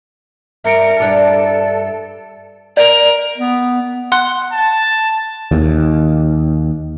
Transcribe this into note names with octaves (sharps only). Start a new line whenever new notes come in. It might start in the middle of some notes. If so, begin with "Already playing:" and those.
G2 A#4 E5 C#7 D7
G2 D4 G4 A4
A#4 D5
B3
F#5 C6 F#6
A5
D#2